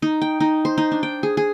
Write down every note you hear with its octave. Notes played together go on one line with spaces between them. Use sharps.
D#4
G5
D#4
C5
D#4
D4
G5
G#4
G#4